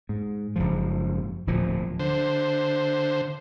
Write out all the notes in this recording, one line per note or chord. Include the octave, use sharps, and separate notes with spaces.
G#2
F#1 G#2 F3
D1 A#2 F3
D3 C5